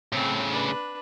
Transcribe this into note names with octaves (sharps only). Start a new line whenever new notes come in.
A2 C#3 C4
D4 B4